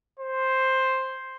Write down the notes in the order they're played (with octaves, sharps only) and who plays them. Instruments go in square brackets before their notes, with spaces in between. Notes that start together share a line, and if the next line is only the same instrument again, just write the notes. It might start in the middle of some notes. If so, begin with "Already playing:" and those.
[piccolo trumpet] C5